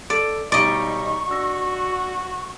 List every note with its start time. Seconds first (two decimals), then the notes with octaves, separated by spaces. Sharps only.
0.10 A4 D5
0.52 B1 G3 D#4 D5 D#5 C#6
1.29 D4 F#4 E6 A#6